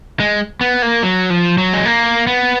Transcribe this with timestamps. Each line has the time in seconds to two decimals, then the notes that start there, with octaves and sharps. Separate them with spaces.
0.20 G#3
0.61 B3
0.82 A#3
1.03 F#3
1.30 F3
1.58 F#3
1.73 G#3
1.86 A#3
2.27 B3